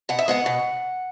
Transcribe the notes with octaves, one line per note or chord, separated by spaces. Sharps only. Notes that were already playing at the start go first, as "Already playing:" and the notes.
B2 F#5
E5
G#3 B3 F#5
B2